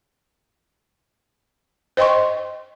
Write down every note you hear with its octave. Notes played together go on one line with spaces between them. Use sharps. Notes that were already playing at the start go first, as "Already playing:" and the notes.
C5 D#5 G5 C6 C#6